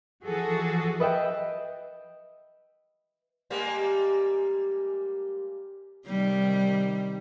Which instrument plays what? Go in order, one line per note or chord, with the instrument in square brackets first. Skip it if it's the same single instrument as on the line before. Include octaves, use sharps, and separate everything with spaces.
[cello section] E3 F3 F#4 G#4 A4
[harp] B4 D#5 E5 G5
[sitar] G3 G#3 A#3
[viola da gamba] C3 D#3 G3